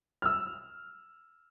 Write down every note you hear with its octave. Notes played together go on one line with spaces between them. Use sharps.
E6 F6